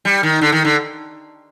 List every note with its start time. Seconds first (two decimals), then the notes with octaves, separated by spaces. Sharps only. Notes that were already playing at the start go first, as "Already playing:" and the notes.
0.05 G3
0.23 D#3
0.41 D3
0.52 D#3
0.65 D3